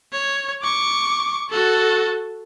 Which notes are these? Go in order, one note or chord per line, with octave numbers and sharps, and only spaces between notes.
C#5
C#6 D6
F#4 A4